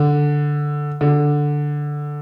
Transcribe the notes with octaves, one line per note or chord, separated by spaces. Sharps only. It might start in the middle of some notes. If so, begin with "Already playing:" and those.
Already playing: D3
D3